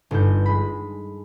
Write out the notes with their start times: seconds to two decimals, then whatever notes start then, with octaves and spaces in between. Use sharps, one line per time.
0.11 G1 D#4 A4 G6
0.46 G#3 B5